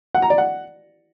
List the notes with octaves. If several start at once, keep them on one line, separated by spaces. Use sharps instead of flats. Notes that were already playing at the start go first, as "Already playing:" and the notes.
F#5
A#5
D5
F#5